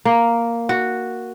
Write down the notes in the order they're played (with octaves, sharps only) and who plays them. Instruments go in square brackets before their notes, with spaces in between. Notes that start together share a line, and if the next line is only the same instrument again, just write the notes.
[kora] A#3
F#4